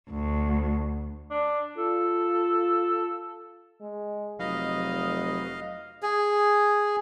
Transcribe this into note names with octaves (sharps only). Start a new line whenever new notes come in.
D2
D4
F4 A4
G#3
F1 F#3 D#4 B4 D#5 F5
G#4